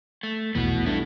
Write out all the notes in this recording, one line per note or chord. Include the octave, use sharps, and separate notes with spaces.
A3
F1 B1 E2 A2 B3 F#4
G2 E4 A4